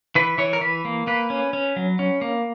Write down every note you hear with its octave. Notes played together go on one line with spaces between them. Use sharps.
E3 B4
E3 C#5
A#4
E3 B4
A#3
A#3 B4
C#4
C#4
F#3
C#4
A#3